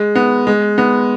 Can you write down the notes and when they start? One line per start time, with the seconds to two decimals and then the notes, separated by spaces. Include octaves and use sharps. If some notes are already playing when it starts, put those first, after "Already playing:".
Already playing: G#3
0.15 B3
0.47 G#3
0.78 B3